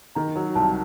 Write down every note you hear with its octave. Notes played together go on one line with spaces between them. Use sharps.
D#3 A#5
F#3
C2 A5